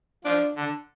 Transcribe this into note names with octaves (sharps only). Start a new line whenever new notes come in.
F3 D4
D3